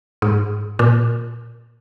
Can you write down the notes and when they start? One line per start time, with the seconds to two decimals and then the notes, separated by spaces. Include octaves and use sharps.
0.22 G#2
0.79 A#2